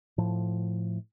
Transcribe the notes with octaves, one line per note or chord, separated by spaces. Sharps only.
A2 F3